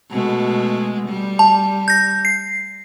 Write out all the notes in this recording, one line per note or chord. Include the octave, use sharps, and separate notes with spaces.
B2 G#3 A3
G3
A5
G6 A#6
C7